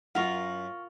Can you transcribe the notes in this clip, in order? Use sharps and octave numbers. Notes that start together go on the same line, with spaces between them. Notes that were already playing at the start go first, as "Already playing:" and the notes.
F#2 F4 A#4 F#5 C#6 F6